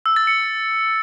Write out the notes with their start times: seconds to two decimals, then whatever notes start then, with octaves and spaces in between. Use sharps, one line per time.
0.06 E6
0.16 A6
0.27 C#7